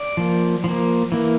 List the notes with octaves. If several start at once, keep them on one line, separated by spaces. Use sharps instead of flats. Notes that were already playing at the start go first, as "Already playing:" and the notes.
Already playing: D5
F3 A#3
F3 A#3
E3 A#3